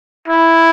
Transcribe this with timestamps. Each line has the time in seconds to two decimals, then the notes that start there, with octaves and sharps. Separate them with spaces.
0.28 E4